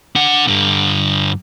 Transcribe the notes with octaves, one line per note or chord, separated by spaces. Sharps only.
D4 F#5
G2 D3